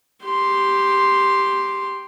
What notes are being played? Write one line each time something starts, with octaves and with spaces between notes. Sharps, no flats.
G4 C6